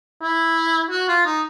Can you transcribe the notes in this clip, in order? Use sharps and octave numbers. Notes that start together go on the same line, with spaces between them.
E4
F#4
F4
D#4